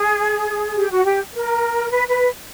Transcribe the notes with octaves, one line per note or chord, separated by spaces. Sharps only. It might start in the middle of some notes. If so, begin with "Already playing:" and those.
Already playing: G#4
G4
F#4
G4
A#4
B4
B4